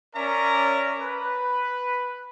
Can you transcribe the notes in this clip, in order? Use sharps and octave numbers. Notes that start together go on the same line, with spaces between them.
C#4 A#4 D5 E5 A#5
B4